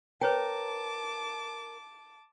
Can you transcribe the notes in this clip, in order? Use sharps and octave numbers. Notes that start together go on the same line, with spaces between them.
A#4 B4 C#5 G5 A5 D6